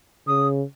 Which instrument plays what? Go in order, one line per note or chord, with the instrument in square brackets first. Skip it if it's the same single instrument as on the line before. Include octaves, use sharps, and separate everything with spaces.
[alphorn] C#3 [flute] D#6